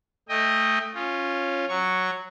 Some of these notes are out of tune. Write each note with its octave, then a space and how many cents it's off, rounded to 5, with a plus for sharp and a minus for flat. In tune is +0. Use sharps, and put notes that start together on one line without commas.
A3 +0 D#5 +0 G5 +20
C#4 -10 F4 +0
F#3 +0 C#6 +0